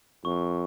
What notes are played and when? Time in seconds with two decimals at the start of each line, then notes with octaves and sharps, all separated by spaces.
0.24 F2 C#6